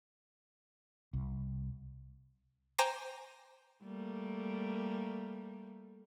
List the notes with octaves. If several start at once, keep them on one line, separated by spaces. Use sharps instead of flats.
C2
C5 G5 G#5 A#5 C6 D6
G3 A3 A#3